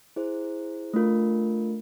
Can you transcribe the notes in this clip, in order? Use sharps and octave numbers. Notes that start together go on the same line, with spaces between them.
E4 G#4 C5
A3 D4 F4 A#4